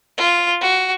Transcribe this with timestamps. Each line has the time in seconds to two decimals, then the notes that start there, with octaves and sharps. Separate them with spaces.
0.18 F4
0.61 F#4